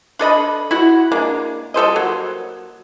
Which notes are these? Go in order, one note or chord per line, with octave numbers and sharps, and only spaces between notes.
D4 A4 D#5 B5
E4 F#4 F#5
G#3 A#3 D4
G3 A4 C5 D#5
F#3 A#3